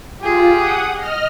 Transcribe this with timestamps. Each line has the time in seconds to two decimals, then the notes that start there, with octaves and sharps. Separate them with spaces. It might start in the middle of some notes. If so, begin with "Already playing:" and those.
0.21 F4 G4 G#4
0.55 F#5 D#6
0.94 D#5 F6